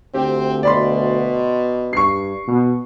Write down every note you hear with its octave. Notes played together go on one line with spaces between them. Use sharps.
D2 C4 G4
B2 D5 B5 C6
G2 C#6 C7
B2